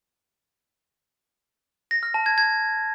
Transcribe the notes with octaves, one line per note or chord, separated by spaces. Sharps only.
A#6
F6
A5
G#6
G#6